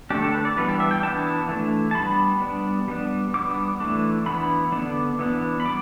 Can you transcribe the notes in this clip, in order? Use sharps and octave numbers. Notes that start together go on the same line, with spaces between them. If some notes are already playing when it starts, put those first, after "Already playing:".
D3 A3 D4 G4
A4
B4
D5
E3 G3 B3 D4 B4
G4
E5
G5
E3 B3 D4 A5
E3 A3 D4
A5
G3 B3 D4 B5
G3 B3 D4
G3 B3 D4
G3 B3 D4 D6
E3 A3 D4
E3 B3 D4 B5
D3 B3 D4
E3 B3 D4
B5
G3 B3 D6